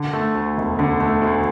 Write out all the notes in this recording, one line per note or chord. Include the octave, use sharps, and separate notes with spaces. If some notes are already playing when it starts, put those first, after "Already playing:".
Already playing: D3
A3
D2
E1
D3
A3
D2